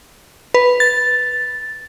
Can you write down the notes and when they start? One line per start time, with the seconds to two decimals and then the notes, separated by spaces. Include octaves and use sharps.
0.54 B4
0.80 A6